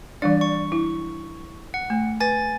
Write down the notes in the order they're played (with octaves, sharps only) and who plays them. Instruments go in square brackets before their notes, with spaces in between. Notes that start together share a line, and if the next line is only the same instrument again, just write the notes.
[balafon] E3 G3 D4 [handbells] D5
[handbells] C#6
[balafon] E4
[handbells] F#5
[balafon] A3
[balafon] B4 [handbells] G#5 A6